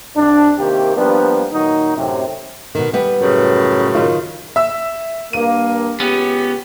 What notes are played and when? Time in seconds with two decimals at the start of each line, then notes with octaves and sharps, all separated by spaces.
0.16 C2 D4
0.59 C3 D#3 A#3 G4
0.96 F3 G3 A#3 B3 D4
1.52 A#2 D#3 F#3 D#4
1.97 F#2 A2 C3
2.75 B2 D#3
2.93 G3 B3
3.20 F#2 A2 C#3
3.95 D#3 F4
4.56 E5 E6
5.33 G2 A#3 D#7
6.00 C#2 B3 C#4 G4